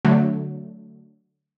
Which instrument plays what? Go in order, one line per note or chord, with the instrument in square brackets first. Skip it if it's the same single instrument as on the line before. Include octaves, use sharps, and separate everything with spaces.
[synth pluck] D3 F#3 A3